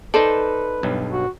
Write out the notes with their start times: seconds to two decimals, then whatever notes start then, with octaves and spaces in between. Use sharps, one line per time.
0.14 D#4 A4 B4 C5 D5
0.83 B1 G2
1.11 F#4